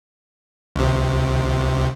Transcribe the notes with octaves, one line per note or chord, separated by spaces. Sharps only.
C#2 C3